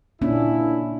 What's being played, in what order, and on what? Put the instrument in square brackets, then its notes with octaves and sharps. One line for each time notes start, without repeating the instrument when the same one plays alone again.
[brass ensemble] A#2 E4 [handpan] A#3 C#4 D4